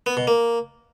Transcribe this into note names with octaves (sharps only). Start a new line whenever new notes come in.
B3
B2
A#3